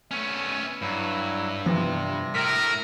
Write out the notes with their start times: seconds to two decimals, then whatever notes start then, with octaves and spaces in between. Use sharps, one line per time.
0.11 A3 B3 C#4
0.82 G2 F#3 E4
1.66 C3 E3 F3 B3 A#6
2.35 A2 A#4 B6